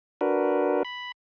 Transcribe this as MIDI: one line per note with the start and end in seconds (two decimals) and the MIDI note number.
0.21 0.83 62
0.21 0.83 66
0.21 0.83 70
0.21 0.83 71
0.85 1.12 83